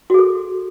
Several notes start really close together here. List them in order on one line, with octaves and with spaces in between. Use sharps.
F#4 G#4 A4